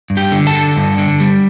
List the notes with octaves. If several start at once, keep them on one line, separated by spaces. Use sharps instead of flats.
G2
G4 G5
D3
A4 A5
D3
G2
D3
G3